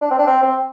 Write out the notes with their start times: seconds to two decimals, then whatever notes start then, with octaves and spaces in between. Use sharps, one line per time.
0.01 D4
0.11 C4
0.18 D4
0.27 C4
0.43 C4